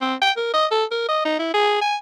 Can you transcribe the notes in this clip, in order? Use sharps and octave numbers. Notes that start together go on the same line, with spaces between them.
C4
G5
A#4
D#5
A4
A#4
D#5
D#4
E4
G#4
G#5